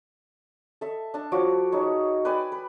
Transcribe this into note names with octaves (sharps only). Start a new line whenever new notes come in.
A4 E5
D4 A5
F3 F#4 C#5 D6
G#3 D#4 C#5
B4 D5 G5 G#5
B4